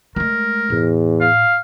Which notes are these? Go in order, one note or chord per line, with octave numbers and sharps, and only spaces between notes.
G#3 A3 A#4
E2 A2
F5